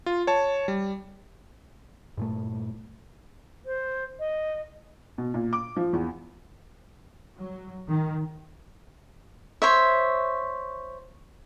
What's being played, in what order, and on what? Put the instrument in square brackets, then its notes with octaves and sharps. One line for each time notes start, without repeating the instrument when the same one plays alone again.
[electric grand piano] F4
C#5 A5
G3
[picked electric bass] G2 A#2 A3
[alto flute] C5
D#5
[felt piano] B2
A#2
D6
F3
E2
[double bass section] F#3
D#3
[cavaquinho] C5 C#5 E5